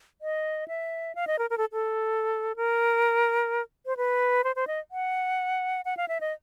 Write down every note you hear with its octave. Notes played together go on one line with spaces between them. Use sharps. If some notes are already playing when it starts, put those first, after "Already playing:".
D#5
E5
F5
D#5
A#4
A#4
A4
A4
A#4
C5
B4
C5
C5
D#5
F#5
F#5
F5
E5
D#5